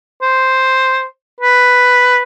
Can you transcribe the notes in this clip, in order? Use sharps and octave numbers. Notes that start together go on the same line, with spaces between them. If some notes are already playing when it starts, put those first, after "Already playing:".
C5
B4